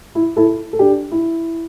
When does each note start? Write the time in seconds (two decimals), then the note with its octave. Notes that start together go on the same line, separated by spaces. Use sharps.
0.15 E4
0.36 E4 A4
0.73 A4
0.79 D4 G4
1.11 E4